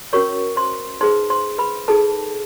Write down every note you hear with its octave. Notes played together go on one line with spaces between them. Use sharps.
C#4 F#4 A#4 C#5 C#6
C5 C6
D#4 G#4 B4 C5 C6
C5 C6
B4 B5
D#4 G#4 A4 B4 A5